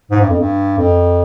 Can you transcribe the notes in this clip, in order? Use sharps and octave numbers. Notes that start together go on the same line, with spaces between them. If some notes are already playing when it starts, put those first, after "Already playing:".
G#2
G2
F2
G2
F2